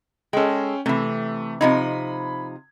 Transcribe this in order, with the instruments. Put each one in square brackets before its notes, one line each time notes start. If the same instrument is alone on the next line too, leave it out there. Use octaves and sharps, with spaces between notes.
[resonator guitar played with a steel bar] G#3 A4 [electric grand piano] C#4 G5
[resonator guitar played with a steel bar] C3 E3 [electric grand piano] A3
[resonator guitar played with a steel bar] C3 F3 D#4 [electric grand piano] B5 G#6